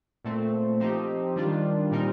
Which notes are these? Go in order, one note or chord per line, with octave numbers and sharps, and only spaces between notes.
A#2 A3 C4
F3 C4 D#4 G4
D#3 G3 D4 F4
A#2 G3 C4 D#4 A#4